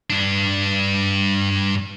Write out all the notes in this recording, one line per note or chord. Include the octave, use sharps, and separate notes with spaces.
G2 D4